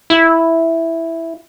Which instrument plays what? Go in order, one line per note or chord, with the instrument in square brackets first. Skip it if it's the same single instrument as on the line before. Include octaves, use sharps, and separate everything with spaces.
[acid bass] E4